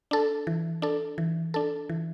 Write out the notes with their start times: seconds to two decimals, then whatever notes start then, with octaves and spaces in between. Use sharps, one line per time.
0.11 D4 A4
0.47 E3
0.82 D4 A4
1.18 E3
1.54 D4 A4
1.89 E3